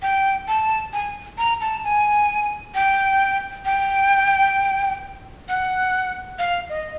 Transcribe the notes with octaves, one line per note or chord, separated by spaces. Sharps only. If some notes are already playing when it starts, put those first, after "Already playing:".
G5
A5
G#5
A#5
A5
G#5
G5
G5
F#5
F5
D#5